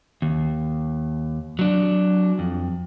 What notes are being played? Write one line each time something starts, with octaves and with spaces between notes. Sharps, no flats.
D#2
F#3 D4
F2